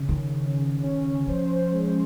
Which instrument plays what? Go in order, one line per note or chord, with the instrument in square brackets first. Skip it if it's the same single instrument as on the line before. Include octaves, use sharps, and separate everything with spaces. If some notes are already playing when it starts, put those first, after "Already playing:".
Already playing: [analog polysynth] C#3 C#4
[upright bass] D#3
[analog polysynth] C#4
C#4
[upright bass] F3 [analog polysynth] C5
[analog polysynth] G#3